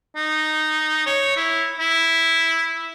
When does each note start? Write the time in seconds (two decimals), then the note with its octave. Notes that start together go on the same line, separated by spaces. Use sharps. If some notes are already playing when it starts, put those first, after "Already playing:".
0.16 D#4
1.06 C#5
1.37 E4
1.80 E4